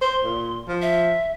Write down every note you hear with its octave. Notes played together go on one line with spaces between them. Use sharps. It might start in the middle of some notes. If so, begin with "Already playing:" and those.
C5 C6
A#2
F3
E5